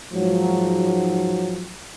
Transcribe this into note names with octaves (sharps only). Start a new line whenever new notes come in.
G#2 F3 F#3